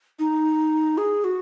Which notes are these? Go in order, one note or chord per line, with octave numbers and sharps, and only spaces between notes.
D#4
G#4
F#4